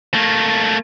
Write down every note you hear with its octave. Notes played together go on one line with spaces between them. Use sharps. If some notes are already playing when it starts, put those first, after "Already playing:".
A3 A#3